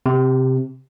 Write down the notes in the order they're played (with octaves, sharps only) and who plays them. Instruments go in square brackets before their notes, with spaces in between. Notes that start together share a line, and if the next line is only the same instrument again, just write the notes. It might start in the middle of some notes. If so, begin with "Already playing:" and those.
[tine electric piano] C3